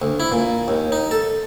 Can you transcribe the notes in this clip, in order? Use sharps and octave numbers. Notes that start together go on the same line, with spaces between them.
D2
E4
A#2
D#2
D#4
A4